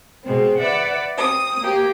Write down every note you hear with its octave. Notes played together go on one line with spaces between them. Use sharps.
B2 G#3 C4
B4 D5 E5 F#5
C4 D#6
A#3 G4